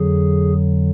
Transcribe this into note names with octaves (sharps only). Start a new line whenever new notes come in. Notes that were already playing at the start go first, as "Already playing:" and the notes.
Already playing: F2 D3 F#3 G#4